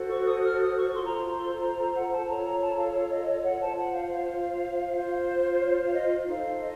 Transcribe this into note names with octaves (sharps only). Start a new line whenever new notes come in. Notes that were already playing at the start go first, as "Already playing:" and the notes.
Already playing: F#4 A4 C5
C#6
D#6
F6
D#6
C#6
F4 A4 C5 C6
A#5
C6
A#5
A#5
F#5
A5
F4 A4 C#5 A#5
A#5
A5
F5
F5
D#5
D#5
F#5
F4 C5 A5
F#5
F5
F5
F4 C5
C#5
F5
D#5
D#4 A4 C5 F5
D#5